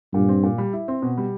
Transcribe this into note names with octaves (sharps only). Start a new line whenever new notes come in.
G2 A#2
C4
A#2
G3
E4
C4
B2
G3